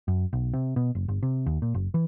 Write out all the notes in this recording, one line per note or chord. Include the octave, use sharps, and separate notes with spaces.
F#2
B1
C3
B2
F#1
G1
C3
D#2
A#2
F#1
E3